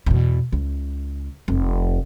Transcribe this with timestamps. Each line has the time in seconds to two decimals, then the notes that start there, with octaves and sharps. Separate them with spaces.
0.06 E2 B2
0.52 C#2
1.48 F1